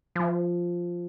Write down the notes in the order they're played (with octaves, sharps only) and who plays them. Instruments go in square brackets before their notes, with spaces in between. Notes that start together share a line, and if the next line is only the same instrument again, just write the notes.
[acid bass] F3